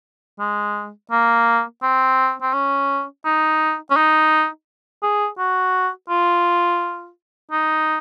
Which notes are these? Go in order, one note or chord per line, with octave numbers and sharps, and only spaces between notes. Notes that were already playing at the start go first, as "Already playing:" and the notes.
G#3
A#3
C4
C4
C#4
D#4
C#4
D#4
G#4
F#4
F4
D#4